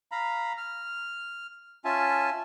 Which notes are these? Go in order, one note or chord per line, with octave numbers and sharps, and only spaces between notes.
F5 A#5 B5
F6
C#4 F4 E5 G#5 A5